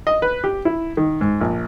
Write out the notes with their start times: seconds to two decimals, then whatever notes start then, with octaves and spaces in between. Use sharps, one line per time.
0.07 D#5
0.22 B4
0.44 G4
0.65 E4
0.97 D#3
1.21 G#2
1.41 A#1